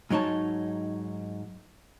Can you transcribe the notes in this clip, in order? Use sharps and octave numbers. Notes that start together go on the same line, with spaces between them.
G#2 F#3 D#4 C#5 A5